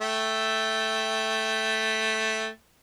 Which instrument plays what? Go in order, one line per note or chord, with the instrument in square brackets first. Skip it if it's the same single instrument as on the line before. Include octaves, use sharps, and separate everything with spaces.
[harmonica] A3 E5 G5